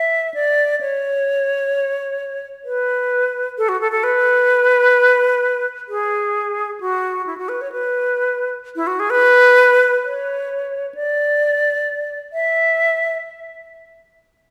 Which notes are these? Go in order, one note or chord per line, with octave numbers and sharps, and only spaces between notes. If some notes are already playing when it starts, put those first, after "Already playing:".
Already playing: E5
D5
C#5
B4
A4
F#4
A4
A4
B4
G#4
F#4
E4
F#4
B4
C#5
B4
E4
F#4
G#4
B4
C#5
D5
E5